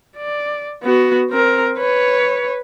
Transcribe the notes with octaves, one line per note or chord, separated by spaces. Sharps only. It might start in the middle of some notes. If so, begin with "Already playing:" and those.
D5
B3 F#4
C4 A#4
B4 C#5